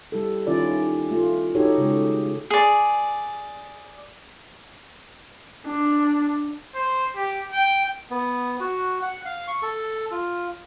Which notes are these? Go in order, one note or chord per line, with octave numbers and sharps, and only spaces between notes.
G3 E4 A4
D#3 C#4 E4 F4 D5
A3 F4
D#4 F#4 G4 A4 C#5
C#3 G#3
G#4 D5
D4
C5
G4
G5
B3
F#4
F#5
F5
C#6
A4
F4